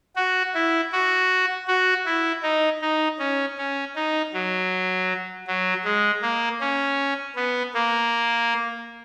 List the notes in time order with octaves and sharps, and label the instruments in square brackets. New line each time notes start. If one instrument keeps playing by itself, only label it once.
[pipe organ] F#4
E4
F#4
F#4
E4
D#4
D#4
C#4
C#4
D#4
F#3
F#3
G#3
A#3
C#4
B3
A#3